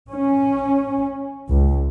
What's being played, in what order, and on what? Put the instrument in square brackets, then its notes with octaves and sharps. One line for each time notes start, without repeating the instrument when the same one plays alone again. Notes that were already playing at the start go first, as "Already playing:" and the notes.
[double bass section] C#4
C#2